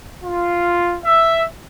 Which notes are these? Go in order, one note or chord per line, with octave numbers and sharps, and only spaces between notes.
F4
E5